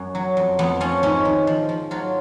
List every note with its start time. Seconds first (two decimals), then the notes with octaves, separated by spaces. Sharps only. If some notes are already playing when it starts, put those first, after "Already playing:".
Already playing: F#2
0.15 F#3
0.37 F2
0.59 F2 B3
0.81 F3 C#4
1.03 G#2 C#4
1.25 D#3
1.47 F3
1.69 F3
1.91 F#3 F4